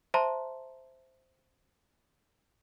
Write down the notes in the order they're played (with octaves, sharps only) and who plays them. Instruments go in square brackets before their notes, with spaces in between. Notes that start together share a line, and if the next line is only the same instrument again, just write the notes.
[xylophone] C5 E5 A5 A#5 C6